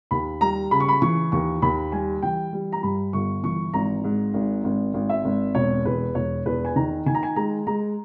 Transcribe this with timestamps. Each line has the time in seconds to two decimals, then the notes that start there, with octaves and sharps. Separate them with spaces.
0.11 D#2 B5
0.41 G3 A#5
0.71 C#3 B5
0.80 C#6
0.89 B5
1.02 E3 C#6
1.32 D#2 C#6
1.62 D#2 B5
1.92 G3 G#5
2.22 E3 G5
2.53 G3
2.73 A#5
2.83 G2 B5
3.13 G1 C#6
3.43 E3 C#6
3.74 G#1 A#5
4.04 G#2
4.34 G#1
4.64 G#1
4.94 G#1
5.10 E5
5.25 G#1
5.55 E1 C#5
5.85 E2 B4
6.15 E1 C#5
6.46 E2 B4
6.65 G#5
6.76 D#3 A#5
7.06 D#3 G#5
7.15 A#5
7.23 G#5
7.36 G#3 A#5
7.67 G#3 A#5